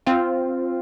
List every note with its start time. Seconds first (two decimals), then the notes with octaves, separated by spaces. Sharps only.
0.06 C4 F4